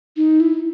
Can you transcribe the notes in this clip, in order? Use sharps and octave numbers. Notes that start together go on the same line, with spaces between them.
D#4
E4